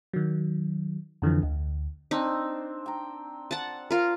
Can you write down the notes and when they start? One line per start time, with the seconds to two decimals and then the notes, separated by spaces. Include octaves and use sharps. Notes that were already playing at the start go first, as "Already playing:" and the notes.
0.13 D#3 F#3
1.22 F2 D3 E3 F3
1.43 D2
2.11 C4 D4 D#4
2.86 G5 A#5
3.51 F#5 A5
3.91 F4 A#4